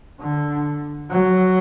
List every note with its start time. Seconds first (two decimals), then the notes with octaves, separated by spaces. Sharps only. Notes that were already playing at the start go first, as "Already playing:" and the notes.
0.20 D3
1.11 F#3